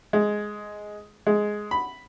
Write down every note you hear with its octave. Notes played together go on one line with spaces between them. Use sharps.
G#3
G#3
B5